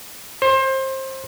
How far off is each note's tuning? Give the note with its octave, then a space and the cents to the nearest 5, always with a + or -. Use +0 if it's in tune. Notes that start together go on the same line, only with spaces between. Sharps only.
C5 +25